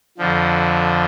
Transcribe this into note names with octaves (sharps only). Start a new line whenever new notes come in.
F2 D3 F3